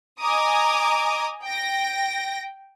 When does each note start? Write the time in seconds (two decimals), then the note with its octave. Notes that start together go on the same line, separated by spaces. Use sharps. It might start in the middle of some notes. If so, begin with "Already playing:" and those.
0.21 D#5 G#5 A#5 D6 D#6
1.44 G5 A#6